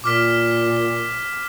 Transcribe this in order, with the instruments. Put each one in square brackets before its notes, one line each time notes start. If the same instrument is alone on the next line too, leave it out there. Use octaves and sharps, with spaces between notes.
[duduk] A#2 [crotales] D6 F6 B6